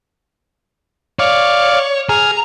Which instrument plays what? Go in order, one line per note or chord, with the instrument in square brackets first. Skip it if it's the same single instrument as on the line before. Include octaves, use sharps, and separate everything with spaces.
[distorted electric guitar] C#5 [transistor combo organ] D5 F5
[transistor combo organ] G#4 F6 [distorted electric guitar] A#5